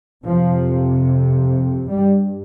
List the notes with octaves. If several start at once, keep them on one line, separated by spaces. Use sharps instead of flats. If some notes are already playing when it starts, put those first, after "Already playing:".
F2 C3 F3
G2 G3